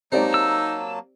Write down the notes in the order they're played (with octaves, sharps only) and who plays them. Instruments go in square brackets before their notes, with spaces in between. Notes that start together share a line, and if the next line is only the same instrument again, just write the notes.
[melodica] F#3 A#3 A5 [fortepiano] C4 G4 D5 [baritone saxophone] D#4
[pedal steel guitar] E6